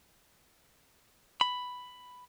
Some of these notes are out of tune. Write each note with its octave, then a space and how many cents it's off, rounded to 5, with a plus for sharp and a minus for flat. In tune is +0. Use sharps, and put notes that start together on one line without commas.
B5 +5